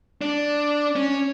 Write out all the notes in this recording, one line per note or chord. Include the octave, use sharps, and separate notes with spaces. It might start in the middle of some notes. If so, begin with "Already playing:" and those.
D4
C#4